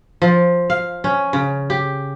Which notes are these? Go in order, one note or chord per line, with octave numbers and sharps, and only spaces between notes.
F3
F5
C#4
C#3
G4